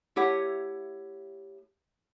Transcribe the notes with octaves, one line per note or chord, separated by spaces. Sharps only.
A3 E4 G4 C#5 F#5